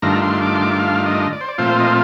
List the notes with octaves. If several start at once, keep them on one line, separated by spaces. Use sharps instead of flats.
G2 D#3 A3 D4 F4 A#5
C6
D6
C6
D6
F5
D#5
D5
C5
D5
A#2 F3 A3 C4 F4 C5
D#5